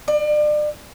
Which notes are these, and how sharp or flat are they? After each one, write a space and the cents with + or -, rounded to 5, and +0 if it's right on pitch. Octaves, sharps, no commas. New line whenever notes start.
D5 +35